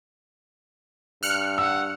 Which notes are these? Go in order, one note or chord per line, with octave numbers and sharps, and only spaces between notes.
G2 F6 F#6 C#7
F#5 E6